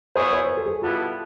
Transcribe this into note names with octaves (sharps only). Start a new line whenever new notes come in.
B3 E4 G#4 C5 C#5
C5
B4
A#4
A4
G#4
B2 G3 B3 E4 F4 A4